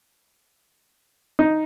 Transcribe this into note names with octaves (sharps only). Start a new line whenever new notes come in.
D#4